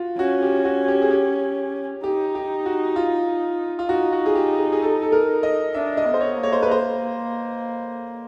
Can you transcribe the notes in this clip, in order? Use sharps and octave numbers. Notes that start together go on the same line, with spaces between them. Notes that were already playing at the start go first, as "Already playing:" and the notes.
Already playing: F4 F#4
C#4 F#4
G4
F#4
G4
G#4
G4
D#4 G4
G4
F#4
F4
F4
D#4 F#4
F#4
G#4
G4
G#4
G#4
A4
A4
A#4
D#5
D4 E5
D#5
B3
C5
C#5
A#3
C#5
C5
B4
C5